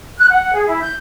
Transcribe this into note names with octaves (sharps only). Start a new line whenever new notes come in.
F#6
F#5
G#4
E4
G6